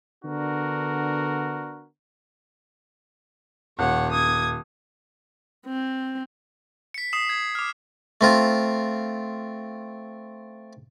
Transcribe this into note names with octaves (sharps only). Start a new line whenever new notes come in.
D3 B3 D4 F#4 A#4
D#1 C#5 F#5
D#6 G#6
C4
B6 C#7
D#6 C7 E7
G#6
D6 F6
A3 C4 F4